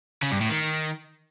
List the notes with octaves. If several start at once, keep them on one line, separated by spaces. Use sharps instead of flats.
C#3
G2
A2
D#3